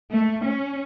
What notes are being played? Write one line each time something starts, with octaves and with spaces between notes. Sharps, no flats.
A3
C#4